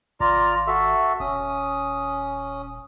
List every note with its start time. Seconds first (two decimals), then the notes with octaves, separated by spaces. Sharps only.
0.20 G#1 F4 D5 A#5
0.67 F#4 A4 E5
1.20 D#1 C#4 D#6